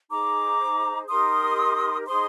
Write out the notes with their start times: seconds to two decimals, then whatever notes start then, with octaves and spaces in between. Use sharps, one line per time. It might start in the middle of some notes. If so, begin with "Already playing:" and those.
0.10 D#4 G#4 C5 A#5 D6
1.09 D#4 G4 A#4 C6 D#6
2.07 D#4 G#4 C5 C6 D#6